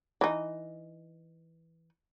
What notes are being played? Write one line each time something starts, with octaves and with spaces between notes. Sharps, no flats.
E3 D#4